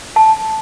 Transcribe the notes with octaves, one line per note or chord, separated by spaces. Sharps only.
A5